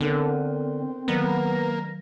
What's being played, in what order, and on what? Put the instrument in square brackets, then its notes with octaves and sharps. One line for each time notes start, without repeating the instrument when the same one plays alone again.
[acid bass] D3 [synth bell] B3 A4 A#4 [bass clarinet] C4
[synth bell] D#3 F#3 A#6 [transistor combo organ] A#3 [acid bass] B3